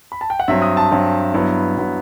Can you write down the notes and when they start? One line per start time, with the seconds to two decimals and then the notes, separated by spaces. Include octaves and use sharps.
0.12 B5
0.21 A5
0.30 G5
0.40 F#5
0.48 G2 F#3 C4 E5
0.62 D#6
0.77 A5
0.91 G2 F#3 C4
1.34 G2 F#3 B3 E4
1.76 G2 F#3 B3 E4